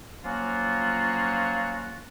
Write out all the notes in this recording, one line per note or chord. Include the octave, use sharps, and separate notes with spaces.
F3 F#3 A#3 C#4 F4 F#4